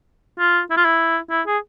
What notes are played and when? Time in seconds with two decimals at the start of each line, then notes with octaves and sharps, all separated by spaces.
0.39 F4
0.71 E4
0.77 F4
0.85 E4
1.31 E4
1.47 G#4